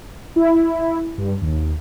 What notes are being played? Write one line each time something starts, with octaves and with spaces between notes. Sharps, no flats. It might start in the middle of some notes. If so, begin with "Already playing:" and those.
E4
G2
D#2